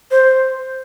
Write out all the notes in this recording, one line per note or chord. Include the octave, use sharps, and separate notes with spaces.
C5